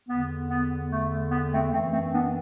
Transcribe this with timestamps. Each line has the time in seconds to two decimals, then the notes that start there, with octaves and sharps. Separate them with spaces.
0.08 E2 D3 B3
0.50 B3
0.90 A3
1.31 B3
1.52 A3 C4
1.72 F#2 E3 A3 C4
1.92 A3 C4
2.06 C4
2.13 B3 D4